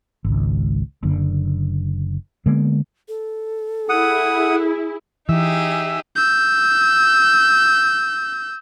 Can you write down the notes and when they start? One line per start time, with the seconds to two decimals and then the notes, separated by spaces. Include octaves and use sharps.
0.25 G#1 C#2
1.03 F#1 D3
2.46 D3 G#3 A#3 B3
3.08 A4
3.89 E4 G#4 F#5 D#6
5.29 E3 D#4 G4 G#4 E5
6.16 E6 G6